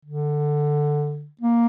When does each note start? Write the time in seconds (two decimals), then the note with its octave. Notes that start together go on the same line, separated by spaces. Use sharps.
0.05 D3
1.41 A#3